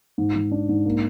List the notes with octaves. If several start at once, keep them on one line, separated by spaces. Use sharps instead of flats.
G#2
G#2
D4
G#2
A#3